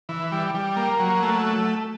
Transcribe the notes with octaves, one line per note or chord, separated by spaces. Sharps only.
E3
G3
G3
A#3
F#3
A3